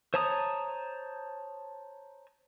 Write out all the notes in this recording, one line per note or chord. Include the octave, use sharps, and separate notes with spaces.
C5 C#5 A5 A#5 D#6